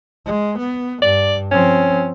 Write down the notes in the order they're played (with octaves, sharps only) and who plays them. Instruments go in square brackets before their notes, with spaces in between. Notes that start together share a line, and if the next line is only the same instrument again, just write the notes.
[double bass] G#3
B3
[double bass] G2 [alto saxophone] D5
[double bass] F3 C4 [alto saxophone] C#4